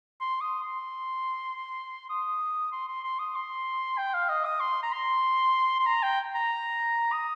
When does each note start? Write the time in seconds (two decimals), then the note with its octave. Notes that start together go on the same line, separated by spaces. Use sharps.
0.21 C6
0.41 D#6
0.63 C6
2.10 D#6
2.72 C6
2.88 C6
3.04 C6
3.19 D#6
3.36 C6
3.98 G5
4.14 F5
4.29 D#5
4.45 D#6
4.61 C6
4.83 A#5
4.93 C6
5.80 C6
5.87 A#5
6.03 G5
6.35 A#5
7.13 D#6